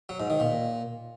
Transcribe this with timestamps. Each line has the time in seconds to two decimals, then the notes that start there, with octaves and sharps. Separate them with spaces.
0.09 F#3
0.20 G#2
0.30 D#3
0.40 A#2